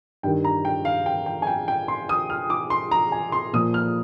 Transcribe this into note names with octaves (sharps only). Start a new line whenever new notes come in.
G2 D#3 G5
A#5
G5
F5
G5
G5
G#5
G5
G5
C6
D#6
F6
D6
C6
A#5
G#5
C6
A#2 F3 D#6
F6